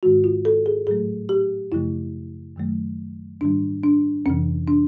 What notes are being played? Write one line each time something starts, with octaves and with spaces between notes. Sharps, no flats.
G#2 D#3 G#3 F#4
F4
A4
G#4
A2 F#3 A3 G#4
G4
F#2 C#3 F3 A3 E4
F#2 D#3 F#3 A3
G#2 D#3 G3 D4
D4
F2 C3 E3 C#4
D4